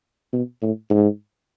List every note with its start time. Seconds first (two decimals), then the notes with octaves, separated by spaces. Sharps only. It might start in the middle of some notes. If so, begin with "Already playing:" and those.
0.33 B2
0.62 A2
0.90 G#2